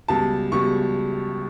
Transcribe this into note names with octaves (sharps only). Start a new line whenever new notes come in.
C#2 B2 G3 A5
C#2 B2 G3 C#6